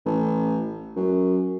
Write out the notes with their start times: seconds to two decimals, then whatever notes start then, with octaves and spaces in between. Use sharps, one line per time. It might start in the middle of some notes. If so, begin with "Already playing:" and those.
0.06 A1
0.96 F#2